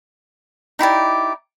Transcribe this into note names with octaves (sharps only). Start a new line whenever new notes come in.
D#4 E4 G4 D5